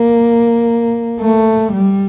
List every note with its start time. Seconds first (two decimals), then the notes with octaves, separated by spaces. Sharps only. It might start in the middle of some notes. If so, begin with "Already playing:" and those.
Already playing: A#3
1.20 A3
1.73 G3